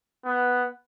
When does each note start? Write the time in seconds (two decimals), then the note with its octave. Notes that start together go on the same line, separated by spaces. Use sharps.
0.25 B3